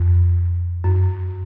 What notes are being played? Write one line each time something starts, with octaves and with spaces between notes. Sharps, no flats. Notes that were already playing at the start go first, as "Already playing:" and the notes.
Already playing: F2
F#2